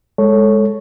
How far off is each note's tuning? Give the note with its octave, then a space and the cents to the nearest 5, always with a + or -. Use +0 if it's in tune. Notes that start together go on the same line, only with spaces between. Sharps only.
G#3 +0 A4 +0 C#5 +0